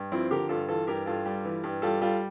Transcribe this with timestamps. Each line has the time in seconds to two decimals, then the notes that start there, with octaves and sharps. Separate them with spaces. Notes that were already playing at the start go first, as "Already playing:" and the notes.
Already playing: G2
0.12 F3 C4 E4
0.31 D3 G4 A#4
0.49 G2 F4 A4
0.68 E3 F4 A4
0.87 G2 G4 A#4
1.06 G2 F4 A4
1.25 G3
1.45 E3
1.63 G2
1.82 G3 F4 A4
2.01 G3 F4 A4